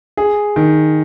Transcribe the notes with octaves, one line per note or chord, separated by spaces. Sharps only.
G#4
D#3